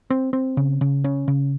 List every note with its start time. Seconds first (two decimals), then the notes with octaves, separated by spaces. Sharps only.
0.10 C4
0.33 C4
0.57 C#3
0.81 C#3
1.04 C#4
1.28 C#3